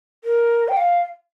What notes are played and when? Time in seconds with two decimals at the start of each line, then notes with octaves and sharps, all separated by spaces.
0.24 A#4
0.68 G5
0.77 F5